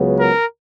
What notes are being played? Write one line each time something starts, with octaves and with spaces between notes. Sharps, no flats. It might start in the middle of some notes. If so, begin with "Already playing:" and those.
Already playing: C#2 C#3 F#3 B3
A#4